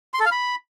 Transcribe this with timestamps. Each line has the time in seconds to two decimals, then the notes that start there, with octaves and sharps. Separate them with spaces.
0.14 C6
0.20 A4
0.26 F5
0.31 B5